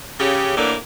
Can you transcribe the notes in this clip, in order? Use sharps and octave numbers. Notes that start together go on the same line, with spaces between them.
C#3 G4
A2 D3 E3 A#3 D4